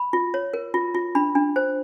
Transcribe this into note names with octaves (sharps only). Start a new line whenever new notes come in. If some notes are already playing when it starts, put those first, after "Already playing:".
Already playing: B5
F4
C#5
A#4
F4
F4
D4 B5
D4
C5